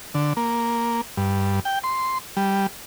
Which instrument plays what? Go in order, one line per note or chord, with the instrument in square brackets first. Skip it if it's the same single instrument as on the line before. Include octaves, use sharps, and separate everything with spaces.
[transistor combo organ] D3
A#3
G2
G5
C6
G3